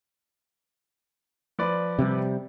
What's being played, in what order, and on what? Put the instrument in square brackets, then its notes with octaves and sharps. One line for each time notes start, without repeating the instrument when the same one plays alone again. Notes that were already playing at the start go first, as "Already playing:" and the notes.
[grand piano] F3 B4 D5
[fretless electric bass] C3 G3